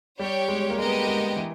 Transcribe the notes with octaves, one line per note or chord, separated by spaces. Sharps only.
G3 G4 C#5 G5
G#3
A#3
G#3 B3 G4 A#4 D#5 G5
G#3
E3